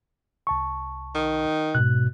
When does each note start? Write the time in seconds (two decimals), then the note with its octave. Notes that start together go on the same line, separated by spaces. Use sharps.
0.47 C2 A5 C#6
1.15 D#3
1.75 G#2 B2 F#6